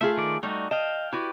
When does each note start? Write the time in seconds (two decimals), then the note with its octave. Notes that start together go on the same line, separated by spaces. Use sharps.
0.01 A3 F4 G#4 E5
0.17 D#3 D5
0.43 G3 A3 D#4 F#4
0.71 D#5 F5 G5 A5
1.13 E4 F#4 G4 B4 D5